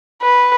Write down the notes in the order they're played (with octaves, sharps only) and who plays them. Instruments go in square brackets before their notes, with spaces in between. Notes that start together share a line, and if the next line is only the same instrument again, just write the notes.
[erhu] B4